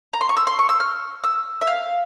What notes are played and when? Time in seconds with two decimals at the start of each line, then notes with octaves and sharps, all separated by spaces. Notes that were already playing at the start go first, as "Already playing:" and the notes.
0.13 A#5
0.21 C6
0.29 C#6
0.37 E6
0.47 C6
0.59 C#6
0.69 E6
0.80 F6
1.24 E6
1.61 E5
1.67 F5